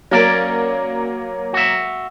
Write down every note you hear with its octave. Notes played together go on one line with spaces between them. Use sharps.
F#3 A#3 C#4 A#4 D5
F#4 E5